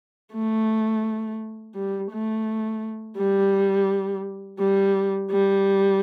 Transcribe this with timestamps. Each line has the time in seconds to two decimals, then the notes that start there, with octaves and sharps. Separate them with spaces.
0.33 A3
1.75 G3
2.11 A3
3.17 G3
4.59 G3
5.31 G3